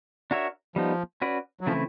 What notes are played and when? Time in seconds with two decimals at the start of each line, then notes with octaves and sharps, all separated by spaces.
0.31 D4 F#4 A#4 C#5 E5
0.76 F3 G3 B3 D#4
1.22 C#4 F#4 B4 D5
1.61 F#3
1.67 C#3 E3 F3 A3 C4 E4